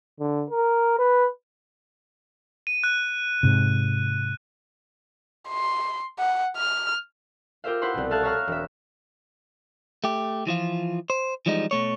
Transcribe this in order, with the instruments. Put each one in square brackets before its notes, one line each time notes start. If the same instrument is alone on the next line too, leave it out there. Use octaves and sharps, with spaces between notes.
[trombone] D3
A#4
B4
[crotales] D#7
F#6
[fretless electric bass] G#2 C3
[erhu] C6
F#5
F6
[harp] F4 G4 A#4 C5 E5 F5
E4 B4 C5 F#5 B5 C6
C2 B2
A4 E5 F5 A5 F#6 G#6
C#5 E5 F5 A#5 F6 F#6
E1 E5
[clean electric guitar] A3 G4
E3 F3 F4
C5
E3 F3 G3 G#3 D#4
B2 A3 C#5